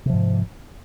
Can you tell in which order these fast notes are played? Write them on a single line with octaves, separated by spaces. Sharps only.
C3 F3 G#2